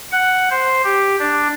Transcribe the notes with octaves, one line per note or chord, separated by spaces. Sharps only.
F#5
C5
G4
D4